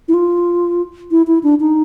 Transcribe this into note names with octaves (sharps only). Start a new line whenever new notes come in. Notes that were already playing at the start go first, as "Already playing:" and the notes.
E4
F4
E4
E4
D4
D#4